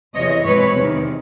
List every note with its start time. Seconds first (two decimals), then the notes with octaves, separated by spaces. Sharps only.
0.15 E2 C3 E3 C#5 D#5
0.45 B2 G#3 C4 B4 C#5
0.75 E2 C3 D#3